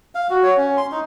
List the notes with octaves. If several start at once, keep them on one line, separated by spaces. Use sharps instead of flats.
F5
F#4
C#5
C#4
C6
D#4